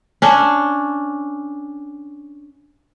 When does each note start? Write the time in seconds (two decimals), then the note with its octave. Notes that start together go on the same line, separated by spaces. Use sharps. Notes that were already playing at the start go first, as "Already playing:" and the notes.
0.22 C#4 D4